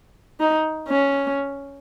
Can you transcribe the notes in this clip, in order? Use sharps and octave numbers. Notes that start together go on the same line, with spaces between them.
D#4
C#4